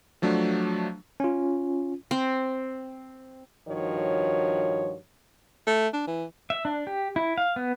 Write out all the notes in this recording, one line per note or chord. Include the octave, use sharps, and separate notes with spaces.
F3 F#3 A3 D4
C#4 F4
C4
G2 D#3 F3 F#4 C#5
A3
D4
E3
E5
D4
G4
E4
F5
B3